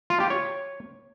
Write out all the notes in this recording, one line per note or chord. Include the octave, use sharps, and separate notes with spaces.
F4
G4
C#5